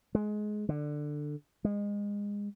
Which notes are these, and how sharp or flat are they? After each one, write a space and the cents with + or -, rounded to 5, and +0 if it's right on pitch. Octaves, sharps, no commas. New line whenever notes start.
G#3 +20
D3 +15
G#3 -25